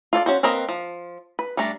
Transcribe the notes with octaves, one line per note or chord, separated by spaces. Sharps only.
F4 A4 C#5 D5
C#4 F#4 C5
A#3 C4 A#4 B4 D#5
F3
B4
G3 A3 D4 A#5